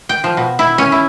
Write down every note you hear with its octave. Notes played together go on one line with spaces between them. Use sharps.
G5
F3
B2
E4
C#4
E4